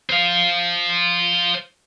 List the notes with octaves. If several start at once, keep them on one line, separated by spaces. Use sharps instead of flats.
C5 F5